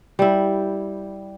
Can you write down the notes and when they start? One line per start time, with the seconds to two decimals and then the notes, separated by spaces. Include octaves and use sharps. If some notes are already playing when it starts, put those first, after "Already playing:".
0.19 G3 E4